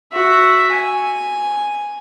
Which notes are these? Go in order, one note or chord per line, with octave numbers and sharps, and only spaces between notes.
F#4 E5
G#5